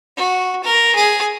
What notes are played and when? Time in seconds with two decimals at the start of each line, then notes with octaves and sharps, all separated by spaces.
0.17 F#4
0.64 A#4
0.95 G#4